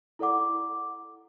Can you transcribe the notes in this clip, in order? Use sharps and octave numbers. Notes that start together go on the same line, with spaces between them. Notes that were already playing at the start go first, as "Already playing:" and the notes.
E4 A4 D5 F#5 D6